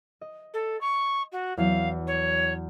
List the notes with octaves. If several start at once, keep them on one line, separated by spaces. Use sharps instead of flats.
D#5
A4
C#6
F#4
E2 F#3 F5
C#5